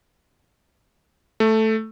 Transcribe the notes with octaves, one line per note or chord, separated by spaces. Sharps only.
A3